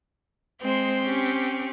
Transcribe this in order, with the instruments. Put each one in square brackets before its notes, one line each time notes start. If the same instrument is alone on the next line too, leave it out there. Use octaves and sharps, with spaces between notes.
[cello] G#3 C5 [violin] C4
[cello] C#4 G4